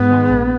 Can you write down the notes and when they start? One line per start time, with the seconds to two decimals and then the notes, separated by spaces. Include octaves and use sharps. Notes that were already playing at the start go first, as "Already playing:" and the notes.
Already playing: G#2 B3
0.10 D#3 G#3
0.30 A#1